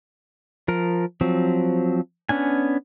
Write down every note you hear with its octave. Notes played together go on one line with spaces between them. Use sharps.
F3 A#4
F3 F#3 C4
B3 C#4 D4 G#5